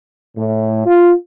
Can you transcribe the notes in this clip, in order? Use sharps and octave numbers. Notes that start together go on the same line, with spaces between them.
A2
F4